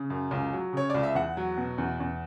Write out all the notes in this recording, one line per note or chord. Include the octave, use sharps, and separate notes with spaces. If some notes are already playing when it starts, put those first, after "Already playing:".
Already playing: C#3
F#2
C#2
F#3
C#3 C#5
C#2 D5
E5
E2 F#5
F#3
B2
E2
E2